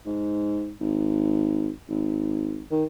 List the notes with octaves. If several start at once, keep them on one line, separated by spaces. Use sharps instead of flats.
G#2
G#1
G#1
D#3